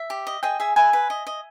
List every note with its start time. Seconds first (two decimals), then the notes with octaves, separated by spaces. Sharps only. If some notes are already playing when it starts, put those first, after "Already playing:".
Already playing: E5
0.10 G4
0.27 D#5
0.43 G#4 D#5 G5
0.60 G#4 E5 G#5
0.76 B4 E5 G#5
0.93 B4
1.10 D#5
1.27 D#5